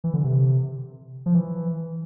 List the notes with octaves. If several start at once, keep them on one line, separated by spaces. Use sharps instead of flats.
E3
D3
C3
F3
E3